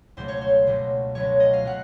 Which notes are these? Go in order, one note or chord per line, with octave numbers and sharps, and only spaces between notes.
C#2 B2 F#3 A3 C5
C#5
C5
C#2 B2 F#3 A3
C#2 B2 F#3 A3 C#5
D#5
F5
B2 F#3 A3 F#5